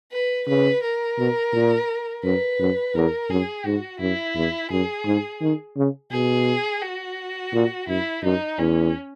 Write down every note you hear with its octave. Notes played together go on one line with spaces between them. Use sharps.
B4
C#3 B4
A#4
B2
A#2
F#2 B4
F#2
E2 A#4
F#2 G#4
G#2 F#4
F#2 E4
E2
F#2 G#4
G#2
D#3
C#3
B2 G#4
F#4
A#2
F#2 E4
F#2 D#4
E2 C#4